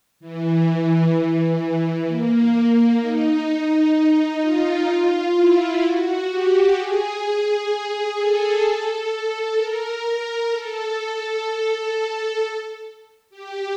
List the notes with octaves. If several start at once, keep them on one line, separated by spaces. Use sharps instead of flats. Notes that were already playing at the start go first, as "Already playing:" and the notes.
E3
E3
A#3
D#4
F4
E4
F#4
G4
G#4
A4
A#4
A#4
A4
G4